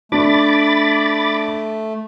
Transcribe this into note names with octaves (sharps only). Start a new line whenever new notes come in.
A3 D4 B5 D6 A6